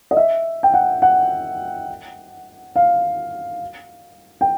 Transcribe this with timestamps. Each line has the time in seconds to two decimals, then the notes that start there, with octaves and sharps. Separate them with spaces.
0.11 D#5
0.17 E5
0.63 G5
0.74 F#5
1.02 F#5
2.76 F5
4.41 G5